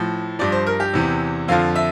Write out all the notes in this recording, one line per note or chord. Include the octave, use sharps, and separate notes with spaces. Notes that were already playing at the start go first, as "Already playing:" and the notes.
Already playing: A2 F3
G2 F3 D5
C5
A#4
G4
E2 C3 E3
F2 D3 F3 F5
E5